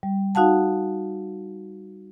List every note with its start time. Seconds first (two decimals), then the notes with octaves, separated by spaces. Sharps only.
0.03 G3
0.35 D#4 F#4 F5 F#5 A5